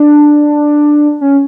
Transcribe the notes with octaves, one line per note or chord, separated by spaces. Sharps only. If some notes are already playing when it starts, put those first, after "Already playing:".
Already playing: D4
C#4